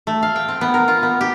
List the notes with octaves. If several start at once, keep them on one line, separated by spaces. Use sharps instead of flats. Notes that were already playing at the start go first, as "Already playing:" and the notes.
A3
F5
G5
C4
B3
A#4
F4
B3
G4